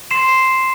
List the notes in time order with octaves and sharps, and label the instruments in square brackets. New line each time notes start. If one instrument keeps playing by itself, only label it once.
[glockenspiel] C6 C7 E7